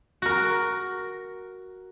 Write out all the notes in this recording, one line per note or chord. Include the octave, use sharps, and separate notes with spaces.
F#4 A#4